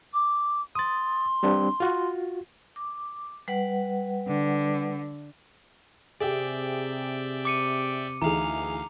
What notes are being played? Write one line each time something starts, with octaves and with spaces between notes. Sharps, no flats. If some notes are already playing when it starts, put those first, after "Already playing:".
D6
C6 D#6 A6
G3 C4 D4
F4 F#4
D6
G3 B4 F#5
D3
C3 G4 G#4 D5 E5 G5
D6 C#7 D#7
D2 E3 D#4 G#4 F5 A#5 F7